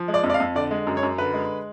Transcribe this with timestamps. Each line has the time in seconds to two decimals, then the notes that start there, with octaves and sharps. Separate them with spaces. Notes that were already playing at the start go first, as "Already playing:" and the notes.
Already playing: F3
0.08 G#3
0.14 D5
0.23 F2
0.30 D5
0.34 F5
0.40 F2
0.55 D3 D5
0.71 G#3
0.87 F#2
0.97 C#5
1.03 F#2
1.18 D3 B4
1.34 G#3